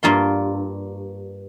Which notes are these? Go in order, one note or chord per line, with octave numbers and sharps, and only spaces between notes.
G2 A#3 F4 C6